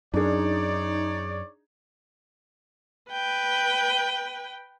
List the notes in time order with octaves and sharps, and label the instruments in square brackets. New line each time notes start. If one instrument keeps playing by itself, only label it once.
[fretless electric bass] F#2 [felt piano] D4 G#4 [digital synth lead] D#4 [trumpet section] C#5 D5
[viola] B4 G5